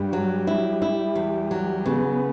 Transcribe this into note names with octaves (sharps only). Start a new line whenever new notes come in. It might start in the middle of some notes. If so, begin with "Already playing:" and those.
Already playing: G2 G3
F#3
E4
E4
E2
F#3
C#3 B3